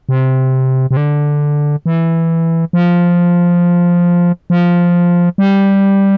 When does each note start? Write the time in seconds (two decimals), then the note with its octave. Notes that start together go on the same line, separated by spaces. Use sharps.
0.09 C3
0.91 C3
0.97 D3
1.86 E3
2.73 F3
4.50 F3
5.38 G3